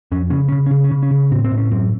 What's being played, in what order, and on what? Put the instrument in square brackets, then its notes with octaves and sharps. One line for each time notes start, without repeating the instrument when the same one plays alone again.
[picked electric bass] F2 C#4
C#3 C#4
C#3 C#4
C#4
C#3
C#4
C#3
C#4
C#3
A2 C4
C4
A2
C#4
F#2 C4